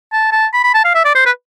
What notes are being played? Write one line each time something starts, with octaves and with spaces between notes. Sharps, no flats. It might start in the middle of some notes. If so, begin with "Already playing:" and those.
A5
A5
B5
B5
A5
F5
E5
D5
C5
B4